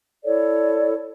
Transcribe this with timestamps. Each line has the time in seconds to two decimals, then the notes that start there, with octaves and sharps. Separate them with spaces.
0.24 E4 A4 C#5 D5